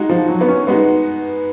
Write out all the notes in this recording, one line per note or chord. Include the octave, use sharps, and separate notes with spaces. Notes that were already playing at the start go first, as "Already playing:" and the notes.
Already playing: G#3 D#4 F#4
F3
F#3
B3
C#4
G#3 B3 D#4 F#4